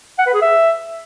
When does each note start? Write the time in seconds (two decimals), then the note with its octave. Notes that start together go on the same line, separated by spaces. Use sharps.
0.18 F#5
0.26 B4
0.34 G#4
0.42 E5